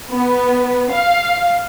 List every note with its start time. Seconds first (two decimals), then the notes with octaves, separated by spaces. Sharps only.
0.11 B3
0.92 F5